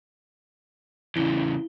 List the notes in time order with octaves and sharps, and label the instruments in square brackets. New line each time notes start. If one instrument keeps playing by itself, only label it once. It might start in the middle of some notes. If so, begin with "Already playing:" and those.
[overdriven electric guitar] E2 C#3 [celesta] E4 G7